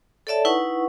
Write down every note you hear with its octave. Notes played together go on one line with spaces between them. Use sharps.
A4 C#5 D5 E5 A5
D#4 E4 B4 F#5 C#6